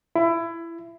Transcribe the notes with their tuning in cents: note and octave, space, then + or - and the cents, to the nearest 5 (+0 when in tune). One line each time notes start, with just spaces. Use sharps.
E4 +20